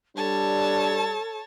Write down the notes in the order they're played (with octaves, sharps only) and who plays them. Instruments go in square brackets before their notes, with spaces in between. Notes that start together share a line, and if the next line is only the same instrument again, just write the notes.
[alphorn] G3 [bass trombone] D4 [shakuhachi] A4 [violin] C#5 A5